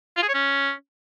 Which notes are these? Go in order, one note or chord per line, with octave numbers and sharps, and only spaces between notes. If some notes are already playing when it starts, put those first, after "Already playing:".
F4
G#4
C#5
C#4